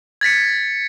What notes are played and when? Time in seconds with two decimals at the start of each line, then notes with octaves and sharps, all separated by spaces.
0.21 G#6 A6 B6 C#7